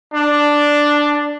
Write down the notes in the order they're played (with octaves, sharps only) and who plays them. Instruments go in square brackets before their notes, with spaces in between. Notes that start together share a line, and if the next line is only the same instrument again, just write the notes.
[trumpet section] D4